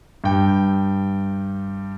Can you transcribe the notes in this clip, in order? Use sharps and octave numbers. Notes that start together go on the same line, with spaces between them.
G2 G5